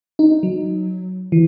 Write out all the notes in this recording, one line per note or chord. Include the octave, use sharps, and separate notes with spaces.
D#4
F#3
E3